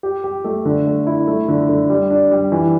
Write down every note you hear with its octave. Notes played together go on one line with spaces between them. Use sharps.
G4
G4
A3
D3
A3
E4
A3
D3
D3
G3
D4
G3
E3